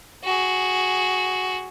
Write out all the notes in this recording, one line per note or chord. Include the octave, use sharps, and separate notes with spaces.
F#4 G#4